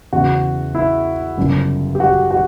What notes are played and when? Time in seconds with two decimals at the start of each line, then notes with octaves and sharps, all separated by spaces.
0.13 E2 C#3 E3 F#4
0.75 E4
1.37 G1 F#2 C#3
1.95 G4
2.00 F#4
2.31 F#4